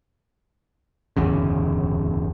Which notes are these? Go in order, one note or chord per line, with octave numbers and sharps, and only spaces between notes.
D1 G1 E2 C#3